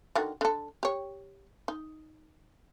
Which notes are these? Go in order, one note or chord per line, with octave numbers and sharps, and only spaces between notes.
D3 D#3 F#4
D3 A4
G4 C#5
D#4